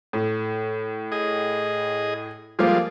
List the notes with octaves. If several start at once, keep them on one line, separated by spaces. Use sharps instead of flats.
A2
G#4 D#5
F3 G3 G#3 A#3 F4